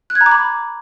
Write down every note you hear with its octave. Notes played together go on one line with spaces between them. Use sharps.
F#6
G#6
A#5
D6
B5